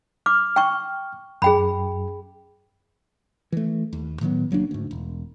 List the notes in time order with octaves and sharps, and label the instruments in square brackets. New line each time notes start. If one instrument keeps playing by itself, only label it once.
[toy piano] D6 [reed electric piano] F6
[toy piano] G5 C#6
[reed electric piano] F#2 [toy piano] G#4 G5 B5
[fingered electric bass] E3 A3
D#2
A2 D#3 F#3 B3
C#2 F#3 A#3 D4
D2 G#2
E1